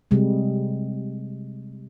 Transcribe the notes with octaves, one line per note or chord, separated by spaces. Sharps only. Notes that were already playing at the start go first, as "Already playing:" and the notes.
C3 G3 G#3